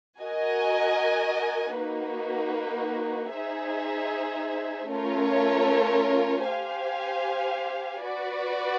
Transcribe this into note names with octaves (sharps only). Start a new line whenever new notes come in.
F#4 A#4 D#5 G#5
A#3 D#4 F#4 B4
D#4 G#4 C5 E5
A3 C#4 F4 A#4 C#5
G4 C5 F5 G#5
F#4 B4 D5